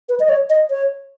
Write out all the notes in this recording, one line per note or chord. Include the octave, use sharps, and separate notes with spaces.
B4
D#5
C#5
D#5
C#5